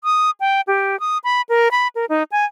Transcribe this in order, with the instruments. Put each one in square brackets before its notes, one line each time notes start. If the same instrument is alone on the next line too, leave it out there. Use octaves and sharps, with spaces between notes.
[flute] D#6
G5
G4
D#6
B5
A#4
B5
A#4
D#4
G#5